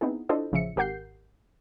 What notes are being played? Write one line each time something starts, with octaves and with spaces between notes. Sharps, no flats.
B3 C4 D#4 E4 G#4
D4 E4 F4 A4 C5 D#5
A1 C#3 F3 E5 C#7
G#1 G4 A#4 F#5 G6 C7